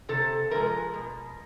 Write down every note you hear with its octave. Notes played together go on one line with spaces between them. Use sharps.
C3 A4
F3 G#3 A#4
B2